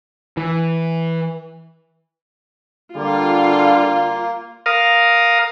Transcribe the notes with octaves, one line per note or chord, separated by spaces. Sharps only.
E3
D3 G3 A#3 F4
A#4 F5 D#6